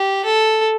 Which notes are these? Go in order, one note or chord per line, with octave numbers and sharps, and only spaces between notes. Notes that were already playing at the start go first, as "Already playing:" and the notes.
Already playing: G4
A4